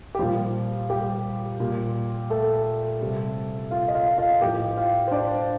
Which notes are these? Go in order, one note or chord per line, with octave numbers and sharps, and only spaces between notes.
G4
A#2 F3 G3 F4
G3 G4
A#2 G3
A3 A4
C3 G3
F4 F5
D#5
F4 F5
F4 F5
A2 F3 G4 G5
F4 F5
C5
D4 D5